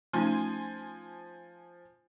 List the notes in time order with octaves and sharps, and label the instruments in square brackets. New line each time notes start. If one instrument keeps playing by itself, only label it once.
[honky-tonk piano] F3 G#5 C6 [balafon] A3 C#4 D#4